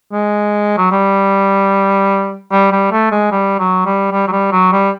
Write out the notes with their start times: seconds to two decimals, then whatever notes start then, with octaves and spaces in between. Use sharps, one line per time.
0.12 G#3
0.78 F#3
0.92 G3
2.52 G3
2.72 G3
2.92 A3
3.11 G#3
3.32 G3
3.59 F#3
3.85 G3
4.12 G3
4.28 F#3
4.32 G3
4.52 F#3
4.72 G3